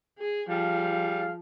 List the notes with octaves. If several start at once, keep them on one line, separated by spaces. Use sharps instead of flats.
G#4
F3 G3 G#4 F5